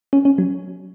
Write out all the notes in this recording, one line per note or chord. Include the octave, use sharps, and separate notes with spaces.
C#4
C#4
F#3